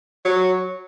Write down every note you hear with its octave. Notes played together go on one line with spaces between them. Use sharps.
F#3